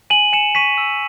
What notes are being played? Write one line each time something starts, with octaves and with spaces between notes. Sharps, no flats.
G#5 D#7 F#7
G#5 C#7 E7
C#6 B6 D#7
E6